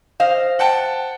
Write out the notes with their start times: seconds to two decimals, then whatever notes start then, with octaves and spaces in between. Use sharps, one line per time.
0.20 C5 D#5 F5
0.59 F#5 G5 A5